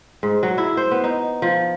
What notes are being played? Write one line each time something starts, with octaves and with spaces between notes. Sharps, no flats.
G#2
F#3
E4
C5
B3
D#4
F3